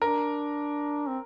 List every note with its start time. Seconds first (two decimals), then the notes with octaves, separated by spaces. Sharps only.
0.02 D4 A#4
1.07 C4